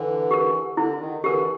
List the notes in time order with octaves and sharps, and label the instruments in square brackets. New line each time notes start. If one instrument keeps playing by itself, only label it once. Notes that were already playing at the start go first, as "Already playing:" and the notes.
Already playing: [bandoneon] D3 E3
[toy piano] G4 A#4
[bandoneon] D3 [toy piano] E4
[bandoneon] D#3
[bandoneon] D3 E3 [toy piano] G4 A#4